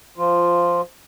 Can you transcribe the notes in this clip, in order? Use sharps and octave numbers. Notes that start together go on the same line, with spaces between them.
F3 F4